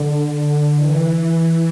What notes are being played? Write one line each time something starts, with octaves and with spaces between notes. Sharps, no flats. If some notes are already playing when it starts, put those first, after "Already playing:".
Already playing: D3
E3